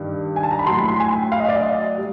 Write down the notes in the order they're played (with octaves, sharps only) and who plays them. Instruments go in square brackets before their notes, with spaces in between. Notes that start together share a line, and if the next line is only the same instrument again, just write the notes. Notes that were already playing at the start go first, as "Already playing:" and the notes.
Already playing: [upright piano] G2 D#3 G3
G#5
A5
A#5
B5
A2 F#3 C6
B5
C6
G#5
G5
F5
D#5
D5
D#5
G3